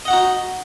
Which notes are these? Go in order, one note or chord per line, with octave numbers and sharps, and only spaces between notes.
D#4 F#4 D#5 F#5